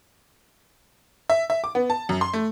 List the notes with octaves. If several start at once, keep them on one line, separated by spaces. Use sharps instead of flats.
E5
E5
D6
B3
A5
F#2
C6
A3